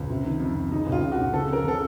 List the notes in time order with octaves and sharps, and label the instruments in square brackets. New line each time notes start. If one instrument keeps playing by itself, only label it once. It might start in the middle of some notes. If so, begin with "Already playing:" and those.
Already playing: [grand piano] C#2
C3
D#3
F2
F2
C#3 D#4
C#2
F4
C#3
F#4
C#2
C#3 A4
F2
A#4
C#3 A4